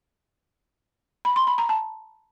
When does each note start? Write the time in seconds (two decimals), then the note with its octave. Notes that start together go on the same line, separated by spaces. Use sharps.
1.25 B5
1.36 C6
1.47 B5
1.58 A#5
1.69 A5